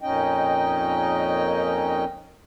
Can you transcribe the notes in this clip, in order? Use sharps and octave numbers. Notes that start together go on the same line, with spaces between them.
F2 A#2 C#4 D#4 D#5 G5